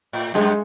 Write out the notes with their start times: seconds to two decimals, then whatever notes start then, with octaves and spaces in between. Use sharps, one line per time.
0.13 A2
0.34 F#2 G#3